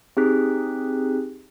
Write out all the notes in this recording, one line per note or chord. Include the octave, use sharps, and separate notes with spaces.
C4 D#4 G4 G#4 F#6 B6